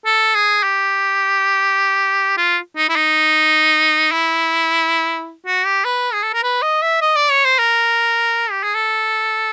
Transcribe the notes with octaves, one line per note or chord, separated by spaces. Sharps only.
A4
G#4
G4
F4
D#4
E4
D#4
E4
F#4
G4
B4
G#4
A4
A#4
B4
D#5
E5
D#5
D5
C#5
C5
A#4
G4
G#4
A4